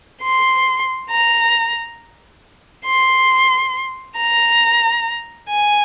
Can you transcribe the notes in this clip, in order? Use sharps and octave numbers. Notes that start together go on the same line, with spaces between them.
C6
A#5
C6
A#5
G#5